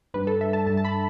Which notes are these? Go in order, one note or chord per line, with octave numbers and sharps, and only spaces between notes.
G2 G3 D4 B4
A4
E5
A5
G2 G3 D4 A5
A5
B5